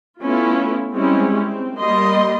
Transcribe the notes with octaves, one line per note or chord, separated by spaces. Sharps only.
A3 B3 C#4 E4 F4
G3 G#3 C4 C#4 E4
C4
G3 A#3 D#5 C6